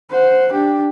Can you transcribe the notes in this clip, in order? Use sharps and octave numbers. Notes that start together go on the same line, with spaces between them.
C5 F#5
D4 G4